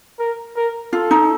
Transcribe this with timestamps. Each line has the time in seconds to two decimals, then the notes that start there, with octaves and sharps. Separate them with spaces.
0.19 A#4
0.56 A#4
0.93 F4 A4
1.11 D#4